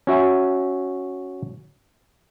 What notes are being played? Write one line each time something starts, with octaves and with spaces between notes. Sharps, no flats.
C#4 F#4 E5 G#5